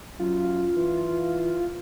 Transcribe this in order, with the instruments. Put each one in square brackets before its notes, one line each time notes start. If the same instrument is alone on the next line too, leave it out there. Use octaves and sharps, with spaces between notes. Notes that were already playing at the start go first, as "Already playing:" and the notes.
[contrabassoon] F#2 [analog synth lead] F4
[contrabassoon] E3